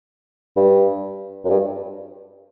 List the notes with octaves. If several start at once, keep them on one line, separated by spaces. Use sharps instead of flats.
G2
F#2
G2